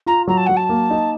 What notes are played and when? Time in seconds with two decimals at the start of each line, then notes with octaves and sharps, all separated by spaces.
0.06 F4 A#5
0.27 F#3 A#5
0.37 A5
0.46 F#3 F#5
0.56 A5
0.69 A#3
0.90 D#4